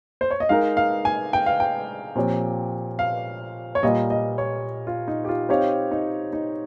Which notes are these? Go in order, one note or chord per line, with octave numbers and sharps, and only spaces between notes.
C5
C#5
D#5
G#3 D#4 A#4 F5
F5
G#5
G5
F5
G5
A#2 F3 C4 G4 C#5
F5
C#5
A#2 G3 A#3 F4 D#5
D#5
C#5
F4
D#4
G4
F4
C4 D#4 G4 C#5 F5
D#4
D#4